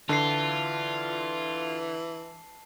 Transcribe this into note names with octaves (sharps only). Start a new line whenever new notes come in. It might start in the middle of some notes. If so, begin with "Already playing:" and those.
D3 E3 F4 A5 C7